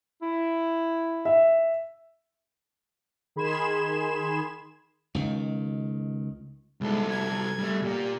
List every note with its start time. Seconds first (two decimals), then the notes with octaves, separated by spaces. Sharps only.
0.22 E4
1.25 E5
3.36 D#3 G#4 B5 C6 G#6 E7
5.15 C#2 D#3
6.81 C2 G#3 A4
7.10 G#6
7.59 G3 A3
7.83 A#2 A#3 G4